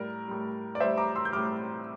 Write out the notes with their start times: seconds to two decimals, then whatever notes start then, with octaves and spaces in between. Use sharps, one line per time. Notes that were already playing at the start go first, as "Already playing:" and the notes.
Already playing: A2 G3 A#4 D5
0.28 A2 G3
0.75 D5
0.80 A2 G3 C5 E5
0.98 A#5 D6
1.16 C6 E6
1.25 G6
1.33 A2 G3 D6 F6